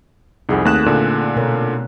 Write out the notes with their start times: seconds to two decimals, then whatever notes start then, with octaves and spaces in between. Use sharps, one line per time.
0.49 C2 F2 D#4 G#4 F#5
0.65 D#2 A3 C4 F#6 E7
0.86 A#2 D3
1.36 B2 A#4 C#5